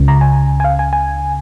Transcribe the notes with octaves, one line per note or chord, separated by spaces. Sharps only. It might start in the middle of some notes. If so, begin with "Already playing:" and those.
Already playing: C#2 C#3
A#5
G#5
G#5
F5
G#5
G#5